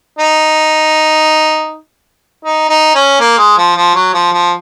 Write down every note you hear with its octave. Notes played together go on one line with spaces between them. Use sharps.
D#4
D#4
D#4
C#4
A#3
G#3
F3
F3
F#3
F3
F3